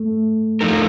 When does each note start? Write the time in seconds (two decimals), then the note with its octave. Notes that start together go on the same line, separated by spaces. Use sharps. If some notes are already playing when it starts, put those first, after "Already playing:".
Already playing: A3
0.61 F3 A3 D#4 A#4